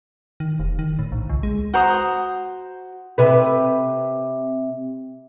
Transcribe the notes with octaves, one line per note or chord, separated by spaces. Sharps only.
D#3
F1
D#3
A2
A#1
C#2
G#3
F#4 C5 A#5 D#6
C3 B4